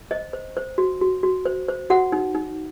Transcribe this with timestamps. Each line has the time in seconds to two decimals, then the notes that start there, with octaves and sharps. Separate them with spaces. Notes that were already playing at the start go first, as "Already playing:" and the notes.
0.11 C5 D#5
0.33 C5
0.57 C5
0.78 F#4
1.01 F#4
1.23 F#4
1.45 C5
1.68 C5
1.90 F#4 F#5
2.12 D#4
2.35 D#4